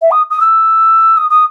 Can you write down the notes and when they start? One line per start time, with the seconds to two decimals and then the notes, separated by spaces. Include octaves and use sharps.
0.02 E5
0.11 D#6
0.30 D#6
0.41 E6
1.17 D#6
1.30 D#6